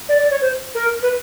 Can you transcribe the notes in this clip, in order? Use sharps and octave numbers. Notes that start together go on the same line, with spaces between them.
D5
D5
C#5
C5
A#4
B4